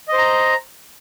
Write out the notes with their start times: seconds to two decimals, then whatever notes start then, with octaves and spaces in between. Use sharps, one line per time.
0.08 D#5
0.13 C5
0.18 A#5